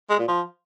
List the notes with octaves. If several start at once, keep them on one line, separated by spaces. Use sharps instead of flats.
G#3
A#2
F3